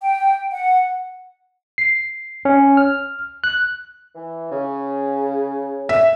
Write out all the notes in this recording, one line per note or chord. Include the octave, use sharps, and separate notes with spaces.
G5
F#5
C7
C#4
F6
F#6
E3
C#3
E5